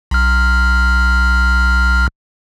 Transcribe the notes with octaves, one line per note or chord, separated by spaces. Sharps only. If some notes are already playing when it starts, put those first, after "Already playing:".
B1 F6